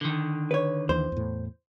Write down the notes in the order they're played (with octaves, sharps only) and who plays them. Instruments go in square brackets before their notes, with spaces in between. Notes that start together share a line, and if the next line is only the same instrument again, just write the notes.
[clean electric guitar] D3 D#3
[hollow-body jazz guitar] B4 C#5
[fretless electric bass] D#2 E3 [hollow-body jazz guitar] C5
[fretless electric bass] E2 A2